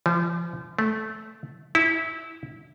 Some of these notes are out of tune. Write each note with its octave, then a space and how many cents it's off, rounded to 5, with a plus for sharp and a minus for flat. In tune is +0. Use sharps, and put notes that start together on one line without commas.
F3 -35
A3 -10
E4 -20